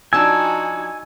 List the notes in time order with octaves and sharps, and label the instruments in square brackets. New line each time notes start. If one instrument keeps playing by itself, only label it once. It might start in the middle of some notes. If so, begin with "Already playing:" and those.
[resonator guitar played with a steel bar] F3 D4 A5 [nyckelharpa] D#4 F#4 [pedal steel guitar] G#5 [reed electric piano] E6